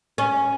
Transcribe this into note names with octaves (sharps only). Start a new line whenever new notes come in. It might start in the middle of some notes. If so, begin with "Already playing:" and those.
C#4